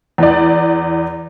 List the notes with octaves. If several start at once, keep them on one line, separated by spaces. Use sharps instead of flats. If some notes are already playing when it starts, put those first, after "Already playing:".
E2 D5